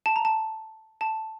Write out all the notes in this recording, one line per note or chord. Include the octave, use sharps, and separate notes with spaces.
A5
A#5
A5
A5